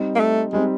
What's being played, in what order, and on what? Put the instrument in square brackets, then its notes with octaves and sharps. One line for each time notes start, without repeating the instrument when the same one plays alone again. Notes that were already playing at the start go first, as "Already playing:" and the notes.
Already playing: [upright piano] G3 C4 D#4
[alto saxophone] A#3
A3
[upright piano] G3 C4 D#4 [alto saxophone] G#3